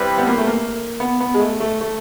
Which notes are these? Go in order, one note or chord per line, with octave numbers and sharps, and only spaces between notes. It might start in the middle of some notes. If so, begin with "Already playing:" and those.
Already playing: G3 C4 E4 G4 B4
B3
A#3
A3
A#3
B3
B3
G#3
A3
A3
A3